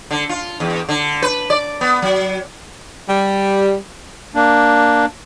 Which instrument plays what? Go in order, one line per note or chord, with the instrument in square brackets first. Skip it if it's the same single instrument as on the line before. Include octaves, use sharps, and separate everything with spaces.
[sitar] D3
F4
E2
D3
B4
D5
B3
F#3
[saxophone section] G3
[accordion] A#3 D4